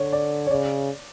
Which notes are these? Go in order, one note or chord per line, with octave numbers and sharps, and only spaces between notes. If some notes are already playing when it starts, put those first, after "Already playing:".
Already playing: D3 C#5
D5
C#5
C#3 D5